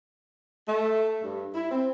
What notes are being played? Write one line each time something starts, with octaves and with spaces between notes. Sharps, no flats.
A3
G2
E4
C4